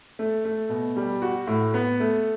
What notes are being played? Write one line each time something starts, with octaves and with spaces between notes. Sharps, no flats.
A3
A3
B2
G3
F#4
A2
B3
A3